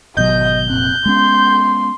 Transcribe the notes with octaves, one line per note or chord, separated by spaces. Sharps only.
G#1 B2 F#3 D#5 G6
F1 A#2 C4 F#6
G#3 B3 C#4 C6